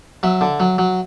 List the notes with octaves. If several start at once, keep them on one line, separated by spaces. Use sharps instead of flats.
F#3 E5
D3
F#3
F#3